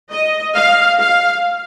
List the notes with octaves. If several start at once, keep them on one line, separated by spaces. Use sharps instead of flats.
D#5
F5
F5